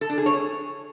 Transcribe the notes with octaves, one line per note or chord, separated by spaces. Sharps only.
A4
D4
G#4
C#5
G#4